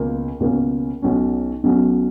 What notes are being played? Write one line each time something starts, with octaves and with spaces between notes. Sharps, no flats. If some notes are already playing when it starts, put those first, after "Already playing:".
Already playing: C#2 B2 A#3 C#4
C#2 B2 A#3 C#4
B1 B2 F#3 C#4
B1 B2 F#3 C#4